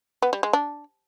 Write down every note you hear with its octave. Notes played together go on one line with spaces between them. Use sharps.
B3
G3
G#3
D4